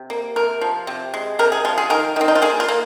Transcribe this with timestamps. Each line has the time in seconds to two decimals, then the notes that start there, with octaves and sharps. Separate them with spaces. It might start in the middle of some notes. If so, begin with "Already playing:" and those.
Already playing: C3
0.10 A#3
0.36 C3 A#4
0.61 F3
0.87 C3
1.14 G#3
1.39 C3 A#4
1.52 G#4
1.65 F3 F4
1.78 G#4
1.90 D#3 A#4
2.16 D#3 C4
2.28 D#4
2.35 F4
2.42 A#3 G#4
2.60 F4
2.68 A#3